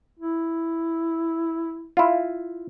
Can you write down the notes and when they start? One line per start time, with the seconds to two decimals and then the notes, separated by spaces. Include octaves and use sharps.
0.19 E4
1.97 E4 F4